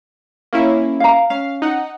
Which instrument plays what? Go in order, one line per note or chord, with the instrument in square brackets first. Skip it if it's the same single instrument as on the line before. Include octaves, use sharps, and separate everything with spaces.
[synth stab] A#3 C#4 E4
[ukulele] F5 A#5
[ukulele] C#4 [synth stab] F5
[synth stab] D#4 F#5